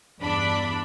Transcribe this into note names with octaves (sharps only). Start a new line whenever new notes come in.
E2 G2 D4 B5